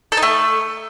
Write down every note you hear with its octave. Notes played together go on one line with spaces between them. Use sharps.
A4
D#4
A3